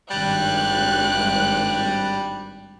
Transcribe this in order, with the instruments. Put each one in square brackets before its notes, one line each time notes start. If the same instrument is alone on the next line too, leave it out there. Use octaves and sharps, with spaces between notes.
[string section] G#1 G2 F#6 [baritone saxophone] G3